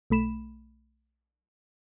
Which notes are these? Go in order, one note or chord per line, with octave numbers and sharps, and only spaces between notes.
B1 A3 B5 E7